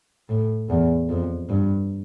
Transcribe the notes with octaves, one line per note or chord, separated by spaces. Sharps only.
A2
E2
F2
G2